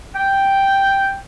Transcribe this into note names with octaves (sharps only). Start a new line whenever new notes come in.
G5